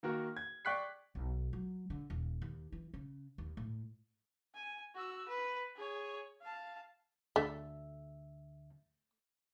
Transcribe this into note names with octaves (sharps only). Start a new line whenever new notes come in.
D#3 A#3 F#4 A#4
G#6
D5 G5 C#6 F#6 B6 C7
B1
F#3
D3
D#1
D#2
E3
C#3
D#2
A2
G#5
F#4 E6
B4
G#4 C#5
F5 A5
D2 D3 A3 E5